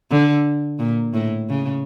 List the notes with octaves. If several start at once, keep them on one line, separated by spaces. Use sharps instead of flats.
D3
A#2
A2
C#3